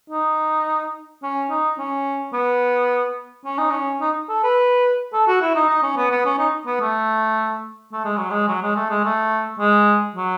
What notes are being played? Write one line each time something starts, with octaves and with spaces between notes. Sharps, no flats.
D#4
C#4
D#4
C#4
B3
C#4
D#4
C#4
D#4
A4
B4
A4
F#4
E4
D#4
D#4
C#4
B3
B3
C#4
D#4
B3
A3
A3
G#3
F#3
G#3
F#3
G#3
A3
G#3
A3
G#3
F#3